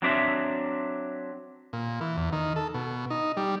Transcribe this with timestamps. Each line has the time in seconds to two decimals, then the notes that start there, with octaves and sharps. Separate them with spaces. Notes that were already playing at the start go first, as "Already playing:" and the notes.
0.02 F#3 C4 D4 C5 E5
1.73 A#2
2.01 E3
2.17 E2
2.33 D#3
2.56 A4
2.74 B2
3.10 D#4
3.37 G3